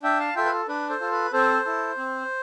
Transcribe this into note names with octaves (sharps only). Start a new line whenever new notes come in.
D4 E5 G5
F5 A5
F4 A4 E5 G5
B4
A4
D4 B4
A4 C5
F4 A4
B4
C4 A4 C5
E4 A4
C4